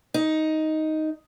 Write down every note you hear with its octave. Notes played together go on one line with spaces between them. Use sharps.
D#4